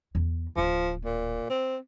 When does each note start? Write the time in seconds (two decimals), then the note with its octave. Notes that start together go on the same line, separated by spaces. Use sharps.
0.15 E2
0.56 D1 F3 E4
1.05 A#2
1.50 C4